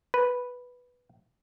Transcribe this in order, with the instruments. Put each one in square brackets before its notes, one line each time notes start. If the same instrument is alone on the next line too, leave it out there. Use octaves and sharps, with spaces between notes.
[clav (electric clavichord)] B4